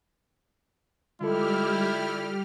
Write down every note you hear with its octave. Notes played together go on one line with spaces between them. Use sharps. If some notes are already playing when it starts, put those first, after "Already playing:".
D3 G3 G#3 E4 F4 G4 A4 F6